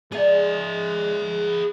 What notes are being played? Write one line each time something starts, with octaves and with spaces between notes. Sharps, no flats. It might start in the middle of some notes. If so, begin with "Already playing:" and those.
G#3 G#4 D5 E5